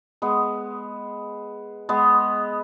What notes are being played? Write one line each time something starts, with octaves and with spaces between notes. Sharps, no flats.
G#3 B3
G#3 B3